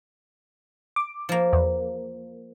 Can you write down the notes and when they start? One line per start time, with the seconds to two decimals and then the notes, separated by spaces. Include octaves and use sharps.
0.96 D6
1.29 F3 A#3
1.53 E2